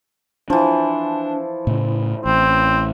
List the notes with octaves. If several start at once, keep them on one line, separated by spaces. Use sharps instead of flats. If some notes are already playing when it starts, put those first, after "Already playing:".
E3 F3 D4
A2 C#3
A1 C4